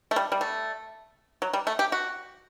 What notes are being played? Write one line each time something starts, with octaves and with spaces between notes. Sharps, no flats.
A3
G3
G3
A3
F#3
G3
A3
G4
F#4